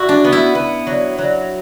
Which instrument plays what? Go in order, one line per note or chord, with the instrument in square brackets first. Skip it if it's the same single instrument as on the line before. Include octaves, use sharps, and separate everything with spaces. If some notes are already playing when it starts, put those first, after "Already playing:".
Already playing: [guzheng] E4 [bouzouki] F#4
[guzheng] D4
[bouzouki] B3
[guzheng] E4
[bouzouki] B3
F#3
F#3